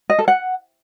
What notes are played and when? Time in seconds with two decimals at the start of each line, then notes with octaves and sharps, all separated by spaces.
0.10 D#5
0.19 A4
0.28 F#5